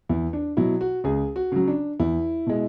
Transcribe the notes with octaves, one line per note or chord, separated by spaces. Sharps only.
E2 E4
D4
B2 F#3 E4
F#4
C#2 G#4
F#4
C#3 F#3
D4
E2 E4
B2 G#3